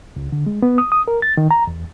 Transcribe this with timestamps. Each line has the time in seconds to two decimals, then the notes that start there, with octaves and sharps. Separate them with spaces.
0.16 C#2
0.32 D3
0.46 G#3
0.62 B3
0.78 D#6
0.92 D#6
1.08 A#4
1.22 A6
1.37 D#3
1.51 A#5
1.67 E2